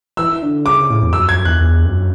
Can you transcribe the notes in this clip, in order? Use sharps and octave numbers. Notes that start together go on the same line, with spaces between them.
E3 E6
E3
D3
C#3 D6
A2
E2
F#2 E6
F#2 G#6
E2 F#6
E2
F#2